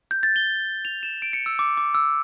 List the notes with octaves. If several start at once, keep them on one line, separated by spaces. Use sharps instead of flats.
G6
A6
G7
F7
E7
D7
C#7
E6
D6
D6
E6